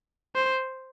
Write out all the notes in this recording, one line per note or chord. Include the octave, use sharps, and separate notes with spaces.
C5